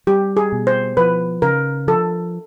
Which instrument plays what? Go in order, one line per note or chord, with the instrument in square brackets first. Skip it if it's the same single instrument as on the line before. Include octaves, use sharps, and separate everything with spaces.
[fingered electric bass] G3 [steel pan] G4
[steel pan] G#4
[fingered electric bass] B2
[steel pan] C5
[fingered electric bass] F3 [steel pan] B4
[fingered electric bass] C#3 [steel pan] A#4
[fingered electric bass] F3 [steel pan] A4